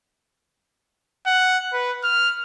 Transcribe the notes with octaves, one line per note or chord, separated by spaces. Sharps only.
F#5
B4
F6